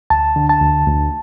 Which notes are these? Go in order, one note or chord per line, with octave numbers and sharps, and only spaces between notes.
D2 A5
D3
A5
D2
D2